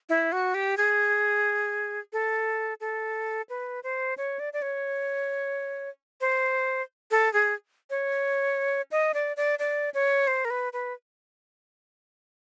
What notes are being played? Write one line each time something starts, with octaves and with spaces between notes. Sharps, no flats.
E4
F#4
G4
G#4
A4
A4
B4
C5
C#5
D5
D5
C#5
C5
A4
G#4
C#5
D#5
D5
D5
D5
C#5
C5
A#4
B4
B4